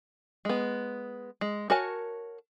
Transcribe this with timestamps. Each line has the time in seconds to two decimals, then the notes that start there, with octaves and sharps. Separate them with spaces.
0.45 G#3 B3
1.41 G#3
1.70 F#4 A#4 C#5 G#5 A5